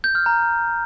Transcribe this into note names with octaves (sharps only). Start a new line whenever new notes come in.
G6
F6
A#5